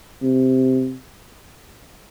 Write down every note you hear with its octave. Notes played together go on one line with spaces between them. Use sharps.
C3